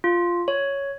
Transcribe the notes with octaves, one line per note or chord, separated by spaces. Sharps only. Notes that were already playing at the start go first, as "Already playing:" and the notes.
F4
C#5